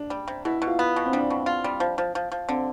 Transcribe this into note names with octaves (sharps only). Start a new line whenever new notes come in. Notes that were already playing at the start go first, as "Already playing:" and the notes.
Already playing: D4
G3
C3
B2 E4
B2
F4
B3
B2
C4
G3 D4
B2
F4
G3
F3
F3
F3
F3
D3 C4